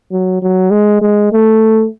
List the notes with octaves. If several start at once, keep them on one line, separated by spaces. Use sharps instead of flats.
F#3
F#3
G#3
G#3
A3